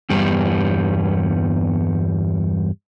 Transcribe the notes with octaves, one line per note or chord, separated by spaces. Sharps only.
E2 G2 G3 B3